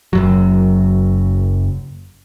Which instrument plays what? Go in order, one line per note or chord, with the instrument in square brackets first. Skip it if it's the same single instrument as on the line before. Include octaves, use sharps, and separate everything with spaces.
[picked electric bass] F#1 F#2 F#3